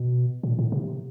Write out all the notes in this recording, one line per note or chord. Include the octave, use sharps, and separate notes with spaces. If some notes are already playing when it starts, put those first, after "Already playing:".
Already playing: B2
A#2
A2
C3